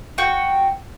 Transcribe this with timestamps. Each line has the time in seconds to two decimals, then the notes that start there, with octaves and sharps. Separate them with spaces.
0.18 F#4 G5